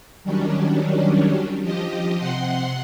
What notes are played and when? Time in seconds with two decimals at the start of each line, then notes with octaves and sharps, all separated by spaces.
0.24 D#3 F#3 G3 C#4 D4
1.61 F3 G4 D#5
2.18 C3 F#5 C6